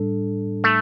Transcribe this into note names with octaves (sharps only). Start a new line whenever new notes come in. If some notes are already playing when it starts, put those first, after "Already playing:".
Already playing: A2 G3 D4 A4
A3